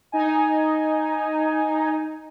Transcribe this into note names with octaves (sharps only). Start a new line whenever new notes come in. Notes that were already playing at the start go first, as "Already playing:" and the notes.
D#4 D#5 G#5